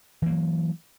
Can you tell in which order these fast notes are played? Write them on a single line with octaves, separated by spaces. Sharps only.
E3 A#3 F#3